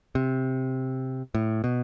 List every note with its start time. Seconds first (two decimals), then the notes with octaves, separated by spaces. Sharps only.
0.15 C3
1.35 A2
1.64 B2